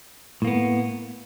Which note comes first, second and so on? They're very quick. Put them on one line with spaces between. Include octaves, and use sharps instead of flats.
A2 A#3 B3